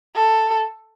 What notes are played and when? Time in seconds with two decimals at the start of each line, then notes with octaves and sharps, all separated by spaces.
0.15 A4